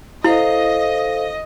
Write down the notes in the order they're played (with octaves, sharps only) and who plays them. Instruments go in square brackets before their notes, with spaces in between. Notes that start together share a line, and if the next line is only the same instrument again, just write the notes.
[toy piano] E4 [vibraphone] A4 C5 F5 [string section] D#5